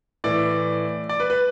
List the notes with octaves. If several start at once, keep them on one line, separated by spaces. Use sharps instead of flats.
A2 E3 D5
D5
B4
B4